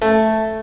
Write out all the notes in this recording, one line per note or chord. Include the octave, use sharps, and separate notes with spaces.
A3